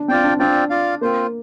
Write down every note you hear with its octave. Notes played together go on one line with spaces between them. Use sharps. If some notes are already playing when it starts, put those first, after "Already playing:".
Already playing: D4
C4 F4 D5 G5
D4
C4 D4 F4 D5 G5
F4 D5 F5
A#3 C4 F4 C5